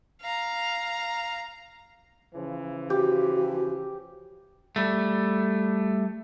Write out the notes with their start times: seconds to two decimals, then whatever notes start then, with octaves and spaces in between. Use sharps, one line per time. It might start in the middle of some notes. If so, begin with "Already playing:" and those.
0.21 F5 A#5
2.34 C#3 E3 F3
2.90 F#4 G4
4.76 G3 A3